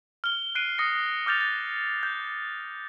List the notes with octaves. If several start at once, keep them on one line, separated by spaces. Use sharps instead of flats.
F6 G7
F#6 C7 D7 D#7
D#6 A#6 C#7
D6 F6 G6 A6 F7
A6
G6